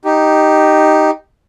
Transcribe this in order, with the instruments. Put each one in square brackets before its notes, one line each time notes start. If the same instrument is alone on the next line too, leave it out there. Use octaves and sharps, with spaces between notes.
[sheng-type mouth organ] D#4 G4